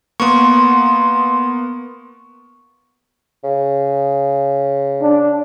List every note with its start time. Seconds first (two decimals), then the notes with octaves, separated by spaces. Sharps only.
0.20 A#3 B3 C6 C#6
3.44 C#3
5.02 D4